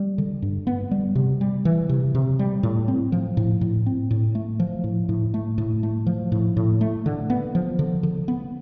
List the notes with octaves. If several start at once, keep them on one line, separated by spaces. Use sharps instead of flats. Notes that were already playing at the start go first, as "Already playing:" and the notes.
Already playing: G3
D3
G2
B3
G3
C3
G3
E3
C3
C3
G3
A2
C4
F3
A2
A2
C4
A2
A3
F3
A2
A2
A3
A2
A3
F3
A2
A2
A3
D3
B3
F3
D3
D3
B3